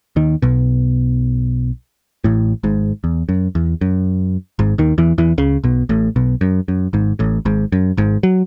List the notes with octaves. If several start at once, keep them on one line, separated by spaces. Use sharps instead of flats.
D#2 D#3
B1 B2
A1 A2
G#1 G#2
E2
F#2
E2
F#2
G#1 G#2
D#2 D#3
E2 E3
E2 E3
C#2 C#3
B1 B2
A1 A2
B1 B2
F#2
F#2
G#1 G#2
A1 A2
G#1 G#2
F#2
G#1 G#2
F#3